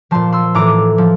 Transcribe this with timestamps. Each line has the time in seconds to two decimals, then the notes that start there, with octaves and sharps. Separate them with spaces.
0.11 A#2 F3 A5 C6
0.32 C6 E6
0.55 A2 E3 A#5 D6
0.98 F3